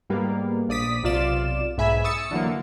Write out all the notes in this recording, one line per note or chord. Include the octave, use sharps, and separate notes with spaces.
G#2 G3 A#3 B3
A#1 D5 D#6 B6
B1 C3 F4 D5 E7
B1 G#2 E5 G#5 B5
C#6 D#6 E6 A6 C#7
D3 E3 F#3 A#3